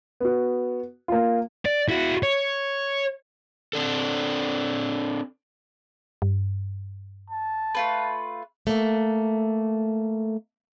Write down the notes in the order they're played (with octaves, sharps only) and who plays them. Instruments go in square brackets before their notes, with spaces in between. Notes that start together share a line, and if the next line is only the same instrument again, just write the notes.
[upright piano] B3 F#4
A#3 F4
[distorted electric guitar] D5
E4 F#4
C#5
[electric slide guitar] C4 D4 A4
[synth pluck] G2
[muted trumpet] A5
[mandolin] A3 F4 B4
[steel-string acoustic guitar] A3 A#3